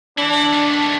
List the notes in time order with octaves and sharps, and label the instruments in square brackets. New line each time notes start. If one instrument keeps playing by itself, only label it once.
[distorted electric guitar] E3 E4 [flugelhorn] D4
[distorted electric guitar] D#3 A3